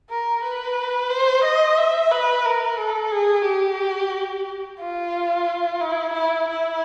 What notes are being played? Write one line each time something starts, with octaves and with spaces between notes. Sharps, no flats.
A#4
B4
C5
D#5
E5
B4
A#4
A4
G#4
G4
F4
E4
E4
E4